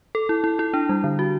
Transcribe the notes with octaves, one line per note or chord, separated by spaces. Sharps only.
A4
E4
E4
E4
D4
G3
D3
F#4